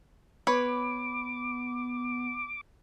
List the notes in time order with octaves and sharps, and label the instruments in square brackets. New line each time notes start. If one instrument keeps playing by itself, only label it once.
[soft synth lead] B3 [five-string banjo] B4 C#5 [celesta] B5 [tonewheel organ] D6